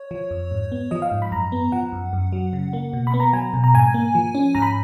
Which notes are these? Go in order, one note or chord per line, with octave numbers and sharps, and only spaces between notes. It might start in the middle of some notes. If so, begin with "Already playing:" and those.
Already playing: C#5
F3
F2
G#2
B3
F3 D#5
F5
G#2
B5
F#2 A#5
B3
F3 F#5
F#2
F#2
F#3
C#3
A#3
B2
B5
B3
A#5
F#3 G#5
B2
A#5
G#2 G#5
A#3
F3
C#4
G#2 A#5
B5